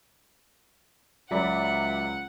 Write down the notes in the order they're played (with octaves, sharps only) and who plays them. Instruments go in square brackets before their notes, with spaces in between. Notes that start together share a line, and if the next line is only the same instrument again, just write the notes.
[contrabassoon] C#2 [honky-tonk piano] F#3 D5 B5 [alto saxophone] E5 [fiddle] F#5